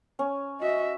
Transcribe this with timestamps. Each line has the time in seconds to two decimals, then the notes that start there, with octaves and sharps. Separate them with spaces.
0.19 C#4
0.60 F#4 D#5 E5